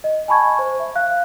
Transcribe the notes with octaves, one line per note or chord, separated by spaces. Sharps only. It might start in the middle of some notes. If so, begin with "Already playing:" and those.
D#5
G#5 A5 B5 C#6 G#6
C5
E5
F5 F#6